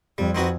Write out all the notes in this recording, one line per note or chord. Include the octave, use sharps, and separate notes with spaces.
F2 G3
C4 D#4 F#4 B4